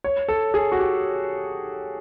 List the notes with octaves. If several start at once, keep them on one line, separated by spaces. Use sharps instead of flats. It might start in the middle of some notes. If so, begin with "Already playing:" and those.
C#5
A4
G#4
F#4
G4